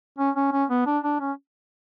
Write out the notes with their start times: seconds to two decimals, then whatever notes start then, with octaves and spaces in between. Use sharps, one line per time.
0.19 C#4
0.35 C#4
0.53 C#4
0.70 B3
0.87 D4
1.04 D4
1.20 C#4